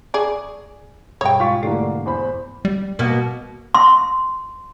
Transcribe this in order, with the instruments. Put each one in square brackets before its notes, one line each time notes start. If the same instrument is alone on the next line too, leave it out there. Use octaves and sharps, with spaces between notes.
[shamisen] G#4 D5 [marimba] A5 C#6
[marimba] G2 B2 G3 [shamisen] C#5 G5
[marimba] G#2 G#3 [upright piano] F4 C#6
[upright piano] D3 E3 A#3 [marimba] A3 G4 D5
[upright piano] E2 C5 B5
[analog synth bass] G3
[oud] B2 A#3 B3
[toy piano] C6